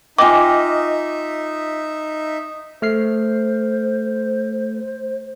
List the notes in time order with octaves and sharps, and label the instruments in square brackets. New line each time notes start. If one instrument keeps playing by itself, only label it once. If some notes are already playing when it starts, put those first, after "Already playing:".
[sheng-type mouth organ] D#4 E5 [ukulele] F4 D#5 [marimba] G5 G#5 [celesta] D6
[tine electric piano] A3 F6 C7 [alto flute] C5